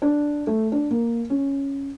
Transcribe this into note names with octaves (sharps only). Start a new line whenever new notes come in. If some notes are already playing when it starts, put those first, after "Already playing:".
D4
A3
D4
A#3
C#4